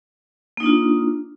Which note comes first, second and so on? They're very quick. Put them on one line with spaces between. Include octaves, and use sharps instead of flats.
A#3 D#4 D4 F4